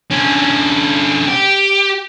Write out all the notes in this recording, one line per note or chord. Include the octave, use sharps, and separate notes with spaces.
D3 C#4
G4